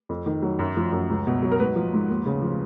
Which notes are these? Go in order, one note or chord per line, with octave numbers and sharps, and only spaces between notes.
F2
D#3
F#3
F#2
F3
F#2
C#2
B2
F#3
A#4
G#2 B4
F3
G#2
D#2
C#3
F3